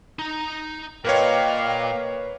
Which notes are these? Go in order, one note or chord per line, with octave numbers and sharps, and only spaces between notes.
D#4 A#5
A#2 A#4 B4 C#5 D#5 F5 G5 D6